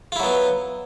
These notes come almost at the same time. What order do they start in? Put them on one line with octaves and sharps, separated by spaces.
F4 E4 F#3 B3